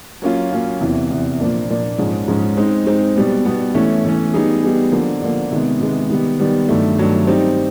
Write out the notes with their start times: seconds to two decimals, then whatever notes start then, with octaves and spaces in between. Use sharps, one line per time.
0.22 F#3 A#3 C#4 F4
0.51 F#3 A#3 C#4 F4
0.81 E2 C3 E3
1.11 E2 C3 E3
1.40 A#2 F3 A#3 D4
1.70 A#2 F3 A#3 D4
1.98 G#2 F3 G#3 C#4
2.28 G#2 F3 G#3 C#4
2.57 G#3 C4 D#4
2.87 G#3 C4 D#4
3.16 B2 G3 B3
3.45 B2 G3 B3
3.75 E3 A3 C#4
4.04 E3 A3 C#4
4.34 G3 B3 D#4 G#4
4.63 G3 B3 D#4 G#4
4.92 D3 F3 A#3
5.22 D3 F3 A#3
5.51 C3 D#3 G#3 B3
5.81 C3 D#3 G#3 B3
6.10 D#3 G3 B3
6.39 D#3 G3 B3
6.69 G2 D#3 F#3 A3
6.98 G2 D#3 F#3 A3
7.27 G3 C4 D#4